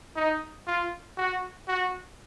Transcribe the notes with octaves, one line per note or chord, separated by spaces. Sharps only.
D#4
F4
F#4
F#4